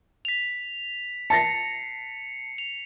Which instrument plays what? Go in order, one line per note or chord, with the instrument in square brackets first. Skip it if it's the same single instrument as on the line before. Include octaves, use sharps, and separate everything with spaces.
[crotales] B6 F7
[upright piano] A5 A6 A#6 [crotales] C7 C#7
[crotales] F7